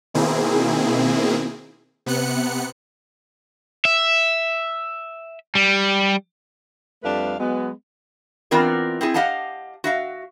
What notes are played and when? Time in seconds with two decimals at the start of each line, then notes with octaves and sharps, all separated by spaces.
0.14 B2 D#3 A#3 C4 E4 G#4
2.06 C3 B3 F#6 C#7
3.85 E5
5.55 G3
7.04 F2 G3 A3 D4 B4 F5
7.39 F#3 G#3 B3
8.51 E3 B3 C4 F4 A#4 D5
9.01 C4 E4 G#4
9.14 G4 D#5 F5 F#5 A5
9.84 F#4 E5 F5